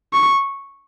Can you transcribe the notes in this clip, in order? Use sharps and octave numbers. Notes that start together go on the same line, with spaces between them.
C#6